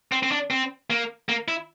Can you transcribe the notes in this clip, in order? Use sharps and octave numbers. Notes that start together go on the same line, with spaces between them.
C4
C4
D4
C4
A#3
A#3
E4